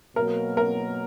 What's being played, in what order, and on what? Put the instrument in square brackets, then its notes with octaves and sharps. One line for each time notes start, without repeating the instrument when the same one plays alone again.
[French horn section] B2 F#3 A#3 [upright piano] A#4
[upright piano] A#4